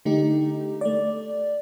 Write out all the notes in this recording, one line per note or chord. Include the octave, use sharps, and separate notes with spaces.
D3 A3 D#4 G4
A3 D5